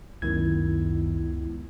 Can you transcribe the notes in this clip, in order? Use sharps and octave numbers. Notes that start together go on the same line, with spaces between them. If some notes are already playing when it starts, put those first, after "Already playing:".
C#2 F#2 D#3 B3 E4 G#6